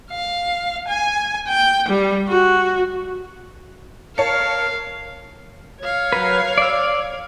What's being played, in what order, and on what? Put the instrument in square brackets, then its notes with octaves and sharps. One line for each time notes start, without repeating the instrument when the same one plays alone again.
[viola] F5
G#5
G5
G3
F#4
[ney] A#4 [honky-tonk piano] C#5 A5 C#7 [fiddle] F5
[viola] C#5 F5
[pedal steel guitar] F#3 A#4 B4
D5 E6